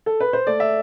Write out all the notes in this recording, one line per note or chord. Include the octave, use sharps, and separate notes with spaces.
A4
B4
C5
A3 D5
E5